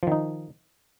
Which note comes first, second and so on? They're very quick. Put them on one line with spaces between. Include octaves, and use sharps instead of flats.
F3 D#3 D#4